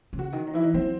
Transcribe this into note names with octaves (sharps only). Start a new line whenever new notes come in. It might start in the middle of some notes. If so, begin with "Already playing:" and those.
C#3
F#4
D#3
D#4
E3 E4
D#4
F#3 C4